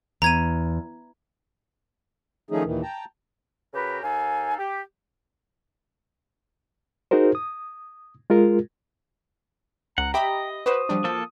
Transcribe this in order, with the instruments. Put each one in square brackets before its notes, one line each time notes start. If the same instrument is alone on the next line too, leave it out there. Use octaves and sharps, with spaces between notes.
[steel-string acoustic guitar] E2 [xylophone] A#5 G#6 D#7
[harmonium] D#3 F3 A3 C#4 D#4 G#4
D#2 A#2 D#3 E3
G5 A5 A#5
[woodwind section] C#3 F#4 G4 A#4 B4
D#2 D#4 A4 F5 G#5
G4
[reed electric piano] D#4 F#4 G#4 A#4 C5
D#6
G#3 F4 G#4 A#4
[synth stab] C#2 [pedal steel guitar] F#5 [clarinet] A#5
[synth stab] G4 E5 B5 [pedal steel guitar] D#5 [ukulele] G5
[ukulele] F#4 C5 [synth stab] B4 [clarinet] D#6
[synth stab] F3 G3 D4
[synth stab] F3 [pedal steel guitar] A#3 A4